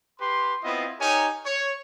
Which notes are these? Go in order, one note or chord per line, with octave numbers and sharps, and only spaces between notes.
G4 B4 C6
B3 C4 E4 F4 D#5
D#4 G4 A#4 C#5 G#5
C#5